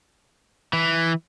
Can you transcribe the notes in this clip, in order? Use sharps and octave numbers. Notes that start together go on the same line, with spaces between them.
E3